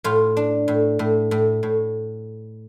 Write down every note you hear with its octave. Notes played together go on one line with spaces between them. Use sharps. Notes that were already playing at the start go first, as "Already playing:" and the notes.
A2 F4
D4
A2
A2
A2
A2